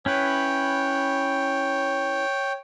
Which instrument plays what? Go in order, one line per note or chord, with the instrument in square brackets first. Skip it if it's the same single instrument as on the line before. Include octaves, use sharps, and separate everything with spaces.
[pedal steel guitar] C#4 E4 B4 [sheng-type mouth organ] C#5 G5